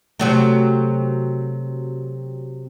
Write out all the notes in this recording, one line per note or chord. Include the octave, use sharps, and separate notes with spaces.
C3 F#3 A3